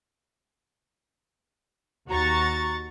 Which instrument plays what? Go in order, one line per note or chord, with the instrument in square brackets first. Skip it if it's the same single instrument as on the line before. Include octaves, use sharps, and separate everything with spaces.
[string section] D#2 F#4 A#5 C#6 A6